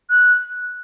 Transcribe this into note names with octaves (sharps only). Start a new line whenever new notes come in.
F#6